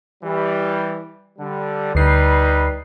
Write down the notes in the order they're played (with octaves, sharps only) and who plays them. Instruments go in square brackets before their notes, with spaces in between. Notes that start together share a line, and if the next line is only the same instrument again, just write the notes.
[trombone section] E3 G3
D3 G3
[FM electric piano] D2 C7 [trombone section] G3 D#4 B4